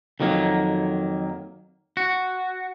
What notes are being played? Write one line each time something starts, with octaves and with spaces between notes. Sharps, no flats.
F2 D#3 F#3 A#3
F#4